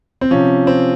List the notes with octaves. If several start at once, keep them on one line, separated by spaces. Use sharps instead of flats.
C4
C3 F3 C#4
C4